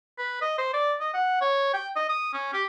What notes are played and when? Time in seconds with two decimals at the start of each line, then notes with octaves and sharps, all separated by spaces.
0.19 B4
0.42 D#5
0.58 C5
0.73 D5
1.00 D#5
1.14 F#5
1.41 C#5
1.74 G5
1.96 D#5
2.09 D#6
2.33 C#4
2.53 G4